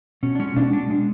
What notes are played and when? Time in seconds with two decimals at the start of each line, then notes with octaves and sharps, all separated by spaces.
0.23 B2 C#4
0.35 D4
0.39 G#3 C#4
0.56 B2 D4
0.73 G#3 D4
0.90 G#3